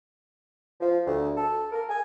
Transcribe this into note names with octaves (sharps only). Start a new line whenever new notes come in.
F3
D2
A4
A#4
G#5